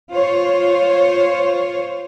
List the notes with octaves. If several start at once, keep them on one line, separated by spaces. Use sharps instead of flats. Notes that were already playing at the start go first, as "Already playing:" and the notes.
F4 C5 C#5